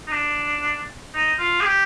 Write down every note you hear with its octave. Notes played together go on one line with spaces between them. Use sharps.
D#4
D4
D#4
F4
G#4
G4